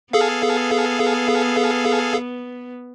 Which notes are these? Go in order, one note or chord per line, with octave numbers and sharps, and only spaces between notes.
B3 G#4 A4 F5